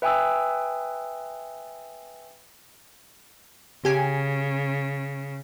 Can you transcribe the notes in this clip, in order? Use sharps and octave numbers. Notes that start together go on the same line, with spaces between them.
B4 E5 G5 G#5 D#6 E6
C#3 G4 G#5